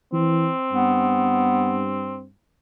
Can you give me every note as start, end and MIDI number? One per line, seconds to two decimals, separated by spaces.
0.13 0.50 52
0.13 2.25 60
0.72 2.32 43
0.72 1.91 59